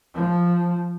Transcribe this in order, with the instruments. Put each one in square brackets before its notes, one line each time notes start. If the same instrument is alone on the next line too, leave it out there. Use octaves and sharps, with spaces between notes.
[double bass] F3